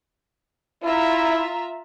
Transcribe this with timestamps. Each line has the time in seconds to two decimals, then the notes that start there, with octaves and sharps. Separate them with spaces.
0.84 E4 F4 E5 A#5